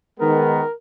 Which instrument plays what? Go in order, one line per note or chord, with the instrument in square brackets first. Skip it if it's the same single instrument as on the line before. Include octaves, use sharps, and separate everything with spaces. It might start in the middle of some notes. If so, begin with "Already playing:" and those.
[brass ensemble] D#3 G#3 B3 [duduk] A#4